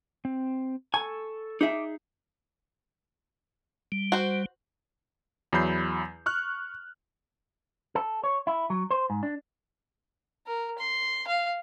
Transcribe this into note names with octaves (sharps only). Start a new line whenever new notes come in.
C4
A4 G#5 C#6
D#4 G#4 E5 D6
G3
F#4 C5
E2 F#3 E4 B5 G6 C7
C#6 F6 F#6
A4
C#5
E4
F#3
C5
G#2
D4
A#4
C6
F5